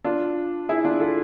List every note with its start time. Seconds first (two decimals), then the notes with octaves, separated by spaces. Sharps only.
0.04 D4 F4
0.69 E4 G#4
0.84 D4 F4
1.00 F4 A4